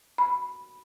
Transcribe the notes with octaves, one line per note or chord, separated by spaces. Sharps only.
B5